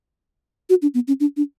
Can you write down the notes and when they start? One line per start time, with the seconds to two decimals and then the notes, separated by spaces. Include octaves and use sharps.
0.70 F#4
0.82 D4
0.94 B3
1.08 C#4
1.20 D4
1.37 D4